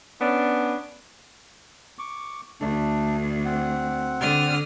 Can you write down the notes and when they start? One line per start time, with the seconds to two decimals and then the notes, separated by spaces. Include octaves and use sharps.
0.21 B3 C#4 D4
1.99 C#6 D6
2.61 D2 A3 D4
3.45 C4 F#5
4.20 D3 D#6 F6